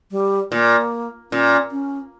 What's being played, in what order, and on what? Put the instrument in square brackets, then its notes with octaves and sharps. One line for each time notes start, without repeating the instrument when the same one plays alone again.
[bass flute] G3
[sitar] A#2 [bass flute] A#3
[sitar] A#2 [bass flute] C#4
[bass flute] C#4